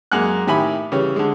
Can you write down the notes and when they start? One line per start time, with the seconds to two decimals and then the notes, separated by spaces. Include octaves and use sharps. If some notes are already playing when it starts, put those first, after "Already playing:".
0.11 F#2 G#3 A#3 F#5 G#5 F#6
0.47 A2 D#3 G4 E5 G#5 B5
0.92 C#3 E3 G3 C#5
1.16 D3 G#3